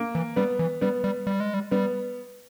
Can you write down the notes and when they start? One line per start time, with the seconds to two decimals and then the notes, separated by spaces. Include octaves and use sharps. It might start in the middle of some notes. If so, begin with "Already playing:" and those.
Already playing: A#3
0.15 E3
0.36 G3 B3
0.59 E3
0.81 G3 B3
1.04 G3
1.27 G3
1.40 G#3
1.54 G3
1.71 G3 B3